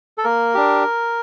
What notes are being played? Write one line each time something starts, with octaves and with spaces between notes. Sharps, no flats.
A4
A#3 A#4
D4 G4